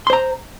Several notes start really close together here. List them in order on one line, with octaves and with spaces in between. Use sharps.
C6 C5 A#5